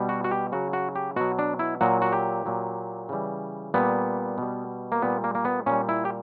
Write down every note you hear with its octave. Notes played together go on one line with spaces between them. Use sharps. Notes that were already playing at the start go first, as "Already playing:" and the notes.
Already playing: B2 G3
F#4
F#4
G4
C#3 F#3 F#4
F#4
G4
B2 F#3 F#4
D4
E4
A#2 F#3 F#4
F#4
G4
A#2 F#3
C#3 E3 G3
A#2 G3 B3
B2 G3
A#3
A#2 G3 B3
A#3
A#3
B3
A#2 G3 C#4
E4
G4